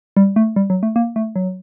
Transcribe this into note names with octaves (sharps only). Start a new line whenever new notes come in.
G3
A3
G3
F#3
A3
A#3
A3
F#3